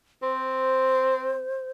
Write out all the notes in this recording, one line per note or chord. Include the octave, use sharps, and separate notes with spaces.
C4 C5